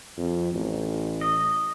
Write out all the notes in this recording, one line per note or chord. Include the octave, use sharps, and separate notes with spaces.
F2
A1
D#5